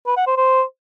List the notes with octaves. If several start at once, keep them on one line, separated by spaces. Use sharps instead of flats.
B4
F#5
C5
C5